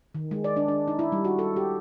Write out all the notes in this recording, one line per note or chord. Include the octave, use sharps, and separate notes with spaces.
D#3
G#3
D5
D4
D4
D#4
E4
G3
F#4
A4
G4